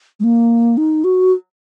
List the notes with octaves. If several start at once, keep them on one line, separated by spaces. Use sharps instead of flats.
G#3
A#3
D#4
F#4